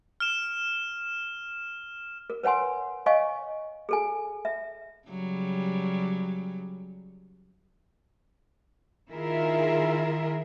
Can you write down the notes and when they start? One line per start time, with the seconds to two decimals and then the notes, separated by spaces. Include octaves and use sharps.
0.20 F6 E7
2.30 A#4
2.43 B4 C#5 F#5 G#5 C6
3.06 C#5 D#5 F5 G#5 C#6
3.89 G#4 A4 G#5
4.45 E5
5.08 C#3 F#3 G3
9.10 D#3 E4 F4 G#4 A#4 E5